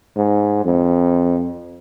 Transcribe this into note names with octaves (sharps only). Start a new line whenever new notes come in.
G#2
F2